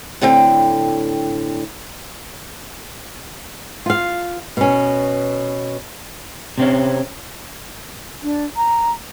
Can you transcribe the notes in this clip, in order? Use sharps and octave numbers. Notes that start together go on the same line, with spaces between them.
A2 D3 C4 G5
F4 F5
B2 C#4
C3 C4 C#4
D4
A#5